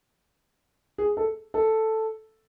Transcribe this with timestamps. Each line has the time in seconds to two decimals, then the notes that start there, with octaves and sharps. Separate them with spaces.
0.98 G#4
1.17 A4
1.54 A4